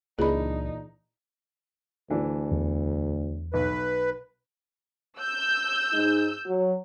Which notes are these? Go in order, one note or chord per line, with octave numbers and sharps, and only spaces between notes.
C#2 A#2 E3 D4 D#4 G#4 B5
D2 E3 D4
E2
B1 B4
E6 G6
G#2 G#3 D#4
F#3